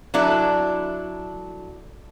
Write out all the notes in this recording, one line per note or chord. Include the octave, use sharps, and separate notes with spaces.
F#3 D4 E4 A4